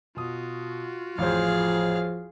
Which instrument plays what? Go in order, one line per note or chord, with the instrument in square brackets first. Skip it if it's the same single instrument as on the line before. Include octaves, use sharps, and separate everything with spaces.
[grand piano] B2 D#6 [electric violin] F4 F#4
[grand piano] A1 F2 C5 [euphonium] F3 [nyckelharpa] G#4 F5